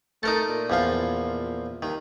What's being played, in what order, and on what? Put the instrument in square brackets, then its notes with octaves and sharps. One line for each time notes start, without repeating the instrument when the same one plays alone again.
[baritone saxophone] A3 [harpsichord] D#4 A#4 A5
[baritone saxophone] A#2
[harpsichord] E2 F3 F5
[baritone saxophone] D#2 [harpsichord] D#3